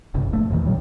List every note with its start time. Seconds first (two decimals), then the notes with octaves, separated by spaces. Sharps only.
0.14 G1 C#2 C3
0.32 A#1 A3
0.50 E2 A#2 D#3 E3
0.65 C#2 A#2 F#3 G3